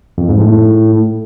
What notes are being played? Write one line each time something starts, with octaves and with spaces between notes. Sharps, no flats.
F2
G#2
A2